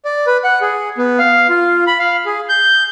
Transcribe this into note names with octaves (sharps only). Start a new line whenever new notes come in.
D5
B4
F#5
G#4
B3
F5
F4
B5
F5
G#4
G6